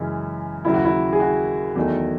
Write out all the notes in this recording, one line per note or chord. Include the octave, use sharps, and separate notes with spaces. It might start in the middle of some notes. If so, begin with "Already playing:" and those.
Already playing: F#2 C#3 E3 G#3 C#4
D#2 C#3 F#3 E4
F#4
E4
G#4
F#4
E2 D#3 F#3 A3